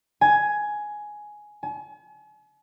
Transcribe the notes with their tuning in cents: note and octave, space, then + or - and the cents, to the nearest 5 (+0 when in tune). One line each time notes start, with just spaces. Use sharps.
G#5 +10
G#5 +45